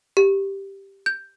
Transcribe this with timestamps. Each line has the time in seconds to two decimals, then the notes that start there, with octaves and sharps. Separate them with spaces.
0.17 G4
1.06 G6